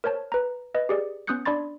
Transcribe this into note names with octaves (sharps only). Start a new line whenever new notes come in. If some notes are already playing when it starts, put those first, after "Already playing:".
A#4 C5 C#5 A5
B4 A#5
B4 D#5
G4 G#4 D5
B3 C#4 D#6 F#6 G6 C#7
D4 D5 B5 C6 A6